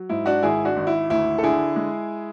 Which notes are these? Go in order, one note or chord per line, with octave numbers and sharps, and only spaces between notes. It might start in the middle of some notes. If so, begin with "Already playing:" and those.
Already playing: F#3
G#2 E4
D4 F#4
G#1 E4 G#4
D4 F#4
G#1
E4
D2 E4
A4
D3 E4 G#4
G#3